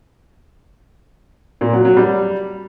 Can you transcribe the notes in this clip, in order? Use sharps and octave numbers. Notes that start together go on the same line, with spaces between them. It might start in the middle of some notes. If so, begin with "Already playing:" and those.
A#2
F#3
F#3
G3